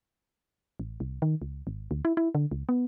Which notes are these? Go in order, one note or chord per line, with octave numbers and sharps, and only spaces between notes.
A1
C2
D#3
C#2
G#1
D2
E4
E4
D3
C#2
B3